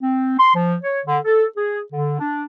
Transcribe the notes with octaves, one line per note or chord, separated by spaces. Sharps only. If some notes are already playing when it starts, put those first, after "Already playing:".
C4
C6
F3
C#5
D3
A4
G#4
D3
D4